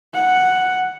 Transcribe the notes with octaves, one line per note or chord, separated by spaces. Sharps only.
F#5